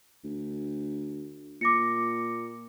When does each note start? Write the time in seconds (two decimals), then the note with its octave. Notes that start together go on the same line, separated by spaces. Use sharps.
0.24 D2
1.61 A#2 D6 A#6 C#7